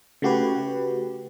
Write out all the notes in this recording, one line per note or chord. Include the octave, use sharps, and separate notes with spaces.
C#3 A3 F#4 G4 B4